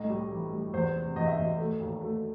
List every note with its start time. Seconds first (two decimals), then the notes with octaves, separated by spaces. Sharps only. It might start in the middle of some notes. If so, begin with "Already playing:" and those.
Already playing: C2 A2 D#5
0.10 G3
0.31 E3
0.53 G3
0.73 E2 C5
0.95 C3
1.16 E2 D#5
1.26 E5
1.37 E2 D#5
1.58 A3
1.80 D#2
2.01 A3